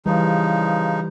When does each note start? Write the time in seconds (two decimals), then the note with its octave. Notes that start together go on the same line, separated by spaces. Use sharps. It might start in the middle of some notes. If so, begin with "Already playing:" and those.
0.06 C#3 E3 F3 G3 D#4